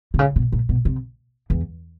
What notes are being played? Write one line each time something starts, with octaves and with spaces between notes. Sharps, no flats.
C3
C#3
B2
A#2
B2
C3
E2